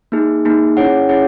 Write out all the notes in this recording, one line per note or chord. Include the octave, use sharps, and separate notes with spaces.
A#3 D#4 G#4
A#3 D#4 G#4
C#4 E4 G#4 C#5 F#5
C#4 E4 G#4 C#5 F#5